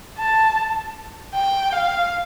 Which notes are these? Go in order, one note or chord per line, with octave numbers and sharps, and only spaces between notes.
A5
G5
F5